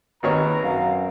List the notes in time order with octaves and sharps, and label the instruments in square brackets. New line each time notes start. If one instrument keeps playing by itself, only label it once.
[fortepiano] G#1 D#3 C#5 [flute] B4 [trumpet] A#5
[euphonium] F#2 [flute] F5